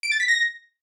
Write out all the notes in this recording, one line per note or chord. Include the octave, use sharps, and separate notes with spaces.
D7
A6
B6
A#6